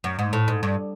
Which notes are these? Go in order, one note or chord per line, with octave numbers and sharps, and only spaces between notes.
F#2
G#2
A2
G#2
G2